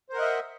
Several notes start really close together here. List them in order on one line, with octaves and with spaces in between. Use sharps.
C5 A#4 F#5 D#5 E5